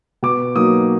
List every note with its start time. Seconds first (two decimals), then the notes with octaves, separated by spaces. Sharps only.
0.23 B2 D6
0.55 F#3 A#3 D#4 D#6